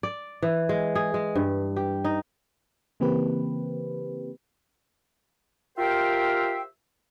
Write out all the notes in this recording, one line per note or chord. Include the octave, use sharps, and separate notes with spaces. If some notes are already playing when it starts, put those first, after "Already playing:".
D5
E3
G#3
G#4
G#3
G2
G4
D#4
C#3 E3 A#3 C4 G4 B4
F4 G4 A#4 C5 E5 G5